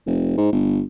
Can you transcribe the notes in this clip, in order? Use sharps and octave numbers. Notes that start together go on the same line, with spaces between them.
F1
G#2
G1